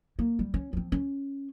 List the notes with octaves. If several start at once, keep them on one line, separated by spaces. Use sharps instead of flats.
A#3
G3
C#4
F3 C4
C#4